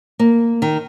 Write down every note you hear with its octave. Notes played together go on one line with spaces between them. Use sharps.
A#3
D#3